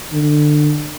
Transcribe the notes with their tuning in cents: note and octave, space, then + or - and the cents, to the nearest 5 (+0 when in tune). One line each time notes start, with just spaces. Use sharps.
D3 +25